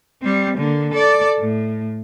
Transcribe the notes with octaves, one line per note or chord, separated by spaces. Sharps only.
G3 C4
D3 A#3
A4 D5
A2